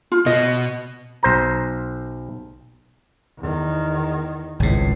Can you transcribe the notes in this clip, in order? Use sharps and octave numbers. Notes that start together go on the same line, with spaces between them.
F4
B2 D#5
B1 C5 A#5
E2 D#3
G#1 C#2 A2